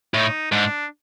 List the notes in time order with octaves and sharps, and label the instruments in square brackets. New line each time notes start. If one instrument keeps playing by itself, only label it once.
[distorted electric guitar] A2 [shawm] D#4
[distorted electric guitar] G#2 [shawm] D4